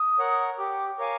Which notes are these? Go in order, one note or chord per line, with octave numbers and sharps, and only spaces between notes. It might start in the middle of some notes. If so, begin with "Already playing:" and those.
Already playing: D#6
A#4 C#5 F#5
G4 D6
A#4 C#5 F5 G#5 D6